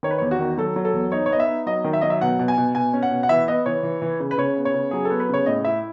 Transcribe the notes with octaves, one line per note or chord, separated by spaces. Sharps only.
D#3 C#5
B4
C#5
E2
F#4
D#3
F#3 A4
F#3
A4
E2
D#4 C#5
C#5
B3 D#5
E5
D#4
F#3 D#5
D#3
E5
F#3 D#5
E5
B2 F#5
B2
G#5
B2
B2 G#5
C#4
F#5
B2
F#5
E3 E5
B3 D#5
E3 C#5
E3
E3
C#3
B4
C#3 C#5
B3
C#5
C#3
F#3 G#4
A4
B3
B4
C#3 C#5
A2 D#5
E4 E5